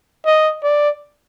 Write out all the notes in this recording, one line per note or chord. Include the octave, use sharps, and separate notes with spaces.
D#5
D5